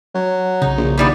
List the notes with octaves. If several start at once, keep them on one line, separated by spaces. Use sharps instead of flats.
F#3 F#5
B1 C#3 D#4
A#1
D#2 E3 G3 B3